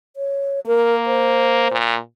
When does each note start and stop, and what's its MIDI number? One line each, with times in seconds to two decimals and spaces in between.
0.16 0.60 73
0.67 1.67 58
0.67 0.96 70
1.06 1.75 72
1.71 1.97 46